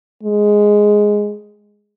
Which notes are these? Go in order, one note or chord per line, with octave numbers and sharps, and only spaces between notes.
G#3